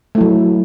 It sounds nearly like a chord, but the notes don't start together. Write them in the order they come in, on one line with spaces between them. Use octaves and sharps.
A3 E4 F#3